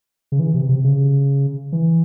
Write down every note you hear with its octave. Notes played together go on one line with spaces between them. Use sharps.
C#3
E3
C3
C3
C#3
E3